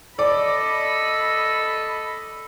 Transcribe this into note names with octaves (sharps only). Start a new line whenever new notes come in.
A4 D5 D#5 B5